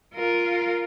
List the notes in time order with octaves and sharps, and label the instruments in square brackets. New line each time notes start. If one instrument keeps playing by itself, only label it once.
[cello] F4 A#4